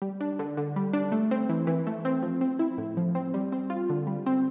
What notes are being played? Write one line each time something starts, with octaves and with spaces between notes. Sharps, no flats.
G3
D4
D3
D3
G3
D4
A3
C4
E3
E3
A3
C4
F3
C4
E4
A2
F3
C4
G3
C4
F4
D3
G3
C4